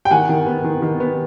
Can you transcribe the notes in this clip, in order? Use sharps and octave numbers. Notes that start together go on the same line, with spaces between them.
G5
D#3 F#5 G#5
D#3
B3
D#3
D#3
B3